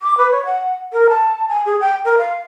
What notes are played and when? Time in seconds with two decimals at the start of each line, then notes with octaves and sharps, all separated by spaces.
0.02 D6
0.18 B4
0.32 C#5
0.45 F#5
0.93 A#4
1.09 A5
1.49 G#5
1.66 G#4
1.81 G5
2.05 A#4
2.18 F5